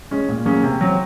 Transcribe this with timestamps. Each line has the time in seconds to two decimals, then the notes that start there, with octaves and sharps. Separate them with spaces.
0.11 G#3 C#4
0.29 A#2
0.45 F#3 A#3 C#4 G#4
0.63 C3
0.81 F#3 C4